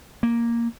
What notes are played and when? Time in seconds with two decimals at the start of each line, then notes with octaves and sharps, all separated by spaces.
0.23 A#3